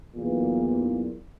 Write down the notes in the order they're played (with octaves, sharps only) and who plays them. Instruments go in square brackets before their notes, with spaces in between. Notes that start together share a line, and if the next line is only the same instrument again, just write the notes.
[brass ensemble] B1 E2 A#2